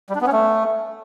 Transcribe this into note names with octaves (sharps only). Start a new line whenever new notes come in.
G3
D4
B3
C#4
A3